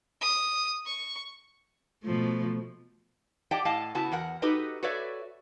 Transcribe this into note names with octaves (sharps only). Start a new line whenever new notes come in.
D#6
C#6
B2 F3 A3
G4 D5 D#5 F#5 G5 A5
A2 D#5 F5 A5
C#3 B3 E4 F#4 A5
E2 A#4 F#5
D#4 F#4 G4 A4 B4 D#5
F#4 A4 B4 C#5 D5 E5